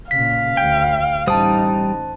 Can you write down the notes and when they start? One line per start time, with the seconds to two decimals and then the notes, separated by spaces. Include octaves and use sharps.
0.11 A#2 C#3 F5 B6
0.57 D2 G5
1.27 A1 G3 D#4 C5 A5 D#6